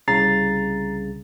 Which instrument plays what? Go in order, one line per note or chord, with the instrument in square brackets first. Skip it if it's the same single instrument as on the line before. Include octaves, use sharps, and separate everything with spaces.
[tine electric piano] C2 C#3 [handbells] A#5 A6 C7